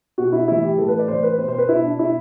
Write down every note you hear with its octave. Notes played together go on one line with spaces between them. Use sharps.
B2 F#4
E4
A2 E3 E4
G4
A2 E3 A4
B4
D5
A2 E3 C5
B4
B2 C5
C5
B4
B2 E4
D4
B2 E4